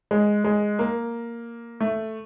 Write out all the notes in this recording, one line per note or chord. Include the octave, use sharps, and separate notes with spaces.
G#3
G#3
A#3
A3